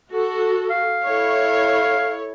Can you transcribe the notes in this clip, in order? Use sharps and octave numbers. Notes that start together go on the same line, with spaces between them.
F#4 A4
F5
E4 A4 C#5